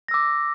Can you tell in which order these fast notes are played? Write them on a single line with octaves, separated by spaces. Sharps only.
A#6 E6 D6